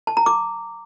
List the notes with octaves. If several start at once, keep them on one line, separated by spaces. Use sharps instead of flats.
A5
A#5
D6